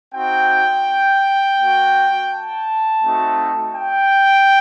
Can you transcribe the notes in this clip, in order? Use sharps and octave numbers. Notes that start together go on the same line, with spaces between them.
C4 D#4 F#4 G5
A#3 F#4
A5
A3 C4 D#4 F#4
G5